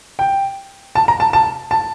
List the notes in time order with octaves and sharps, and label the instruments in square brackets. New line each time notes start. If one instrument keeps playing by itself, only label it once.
[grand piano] G5
A5
A#5
A5
A5
A5